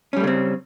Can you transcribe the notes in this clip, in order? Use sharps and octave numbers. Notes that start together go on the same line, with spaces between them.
C#3 G3 A3 C4 C#4